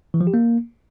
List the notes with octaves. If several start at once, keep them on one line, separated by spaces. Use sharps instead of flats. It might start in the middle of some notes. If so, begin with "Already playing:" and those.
E3
F3
G4
A#3